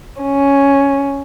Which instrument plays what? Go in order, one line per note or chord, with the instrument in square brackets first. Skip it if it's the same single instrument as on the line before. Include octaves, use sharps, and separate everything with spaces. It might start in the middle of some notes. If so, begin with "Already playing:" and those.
[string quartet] C#4